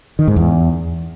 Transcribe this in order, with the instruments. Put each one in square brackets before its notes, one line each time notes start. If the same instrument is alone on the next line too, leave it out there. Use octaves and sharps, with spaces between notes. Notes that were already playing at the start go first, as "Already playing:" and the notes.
[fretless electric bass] D#3
G#2
E2